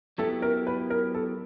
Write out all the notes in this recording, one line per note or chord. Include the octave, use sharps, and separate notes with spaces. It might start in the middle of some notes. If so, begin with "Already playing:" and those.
F#3 B3 E4 G4 A4
A#4
B4
A#4
A4